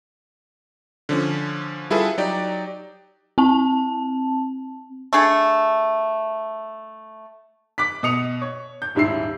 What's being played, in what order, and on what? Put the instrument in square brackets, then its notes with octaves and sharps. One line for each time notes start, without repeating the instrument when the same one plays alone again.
[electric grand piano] D3 F3 C#4
G3 E4 F4 G#4 A4 B4
F#3 D#4 G4 D5
[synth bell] C4 A5
[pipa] A3 D4 G#4 A4
[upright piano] D6 F#6 B6
B2 D#5 D#6 C#7 F7
C#5
G6
D#1 G#2 E4 E6 C7